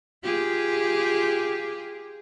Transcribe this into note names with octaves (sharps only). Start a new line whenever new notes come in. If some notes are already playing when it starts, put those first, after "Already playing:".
F4 G4 G#4